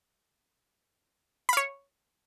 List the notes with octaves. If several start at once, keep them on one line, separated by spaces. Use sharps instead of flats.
C#5 F5 B5